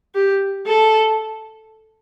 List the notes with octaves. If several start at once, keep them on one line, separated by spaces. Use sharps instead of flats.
G4
A4